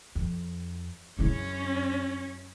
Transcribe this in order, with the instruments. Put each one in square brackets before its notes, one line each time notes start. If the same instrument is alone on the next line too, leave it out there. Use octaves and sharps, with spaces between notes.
[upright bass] F2
[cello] F#2 C#4 [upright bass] C#3 E4